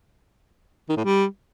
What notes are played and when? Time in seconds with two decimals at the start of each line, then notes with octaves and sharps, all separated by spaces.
0.89 D#3
0.97 A2
1.05 G3